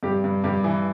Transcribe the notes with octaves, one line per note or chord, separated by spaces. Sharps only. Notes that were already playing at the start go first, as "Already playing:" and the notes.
G2 G4
G2
G2 G4
E3